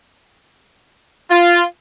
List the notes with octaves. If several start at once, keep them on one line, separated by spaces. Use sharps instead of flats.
F4